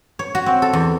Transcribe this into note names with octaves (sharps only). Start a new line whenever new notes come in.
C#5
F#4
C4
A4
E2